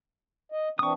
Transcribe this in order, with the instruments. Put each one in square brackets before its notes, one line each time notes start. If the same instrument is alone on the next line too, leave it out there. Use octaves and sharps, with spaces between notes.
[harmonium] D#5
[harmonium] E3 C4 D4 [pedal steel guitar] C#6 D#6